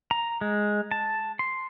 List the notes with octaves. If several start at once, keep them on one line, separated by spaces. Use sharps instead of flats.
A#5
G#3
A5
C6